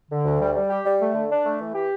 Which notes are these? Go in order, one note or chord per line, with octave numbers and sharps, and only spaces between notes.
D3
D2
G3
G3
G4
G3
A3
D3
D4
A3
E3
G4